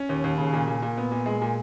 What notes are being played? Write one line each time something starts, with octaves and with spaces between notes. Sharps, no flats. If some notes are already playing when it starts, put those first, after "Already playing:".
Already playing: C#4
D#2
D#2
C#3
A#2
A#2
A#2
B3
A#2
G#3
A#2